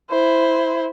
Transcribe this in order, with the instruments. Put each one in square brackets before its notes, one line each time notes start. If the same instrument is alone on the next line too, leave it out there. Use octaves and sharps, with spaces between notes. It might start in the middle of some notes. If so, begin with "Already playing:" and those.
[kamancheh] E4 C5